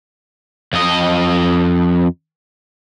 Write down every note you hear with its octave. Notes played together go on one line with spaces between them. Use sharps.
F2 D#5